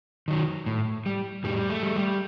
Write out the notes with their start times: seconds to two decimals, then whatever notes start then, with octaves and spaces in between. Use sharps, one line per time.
0.28 D#3 F#3
0.66 A2
1.06 G3
1.44 A2 G3
1.70 A3
1.83 G3
1.96 G3